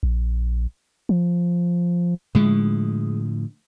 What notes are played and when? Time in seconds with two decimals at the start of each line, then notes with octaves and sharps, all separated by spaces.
0.03 A#1
1.09 F3
2.35 A2 D3 F3 G#3